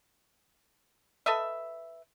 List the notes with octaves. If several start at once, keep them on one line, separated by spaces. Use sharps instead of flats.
A4 B4 D#5 E5